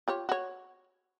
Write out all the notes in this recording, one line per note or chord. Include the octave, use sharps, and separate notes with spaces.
F4 G4 C#5
F#4 C#5